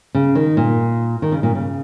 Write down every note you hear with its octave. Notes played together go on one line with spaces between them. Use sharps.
C#3
D#3
A#2
D#3
C#3
A#2
C#3